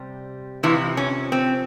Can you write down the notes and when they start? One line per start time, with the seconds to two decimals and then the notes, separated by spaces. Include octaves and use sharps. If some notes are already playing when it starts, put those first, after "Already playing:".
Already playing: C3 G3
0.63 F2 C3 E3 F3 E4
0.97 C#4
1.32 C4